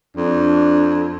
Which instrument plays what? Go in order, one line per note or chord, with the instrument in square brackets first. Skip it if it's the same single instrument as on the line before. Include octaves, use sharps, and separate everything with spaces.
[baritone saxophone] F2 [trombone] D4